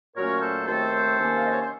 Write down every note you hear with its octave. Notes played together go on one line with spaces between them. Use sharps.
A#2 F#3 A3 C#4 A#4 C#5
A4 C5
D#2 D#3 A3 C4 A4 C5
C3 D#3 A#3 C#4
F5
D#5
C#5
C5